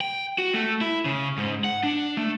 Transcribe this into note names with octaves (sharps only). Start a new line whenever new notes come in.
G5
F#4
A3
E4
C#3
G#2
F#5
D4
A3